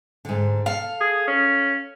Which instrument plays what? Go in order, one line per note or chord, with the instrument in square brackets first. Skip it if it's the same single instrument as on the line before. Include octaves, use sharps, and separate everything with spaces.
[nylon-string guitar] G#2 D3
[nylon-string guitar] A4 [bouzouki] F5
[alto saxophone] G#4
C#4